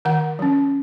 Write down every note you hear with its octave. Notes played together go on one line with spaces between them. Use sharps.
D#3 F#5
F#3 C#4